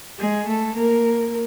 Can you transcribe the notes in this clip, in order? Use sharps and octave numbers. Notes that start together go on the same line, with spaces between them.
G#3 G#4
A3 A4
A#3 A#4